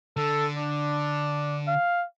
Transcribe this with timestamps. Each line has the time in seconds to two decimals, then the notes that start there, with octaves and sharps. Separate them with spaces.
0.17 D3 A4
0.56 D4
1.68 F5